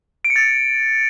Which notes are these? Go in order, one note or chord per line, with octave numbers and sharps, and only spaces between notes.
D7
C#7
A6